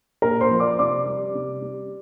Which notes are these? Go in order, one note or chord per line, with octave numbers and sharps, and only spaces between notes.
A#2 A#4 A#5
C5 C6
F3
D5 D6
C3 D5 D6
G3
C3
G3